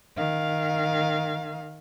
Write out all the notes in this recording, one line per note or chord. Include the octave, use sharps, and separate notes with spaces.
D#3 F5